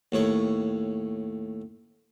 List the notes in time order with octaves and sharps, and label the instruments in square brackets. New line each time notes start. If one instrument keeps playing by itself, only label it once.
[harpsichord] D#2 A2 C#5